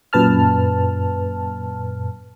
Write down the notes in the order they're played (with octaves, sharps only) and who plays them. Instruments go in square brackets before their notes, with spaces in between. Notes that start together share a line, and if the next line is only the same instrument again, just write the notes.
[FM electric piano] F#2 A#2 B4 A5 F6